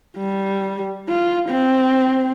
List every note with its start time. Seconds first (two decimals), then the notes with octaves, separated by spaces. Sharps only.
0.18 G3
1.09 F4
1.49 C4